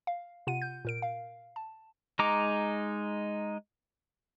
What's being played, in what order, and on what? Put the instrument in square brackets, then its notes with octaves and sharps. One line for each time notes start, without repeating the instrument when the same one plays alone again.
[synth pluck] F5
C3 F4 F#5 D#7
G6
A#2 A#4 D7
F5
A5
[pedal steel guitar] G#3 D#4 A#5 D6